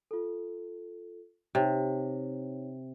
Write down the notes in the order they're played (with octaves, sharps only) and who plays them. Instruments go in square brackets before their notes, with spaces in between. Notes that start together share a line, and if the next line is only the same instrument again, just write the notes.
[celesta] F4 A4
[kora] C3 [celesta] D#4 C#5